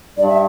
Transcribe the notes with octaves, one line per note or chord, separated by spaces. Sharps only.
G2 D5
E5